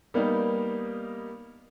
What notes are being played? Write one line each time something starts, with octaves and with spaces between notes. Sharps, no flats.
G3 A#3 B3 D#4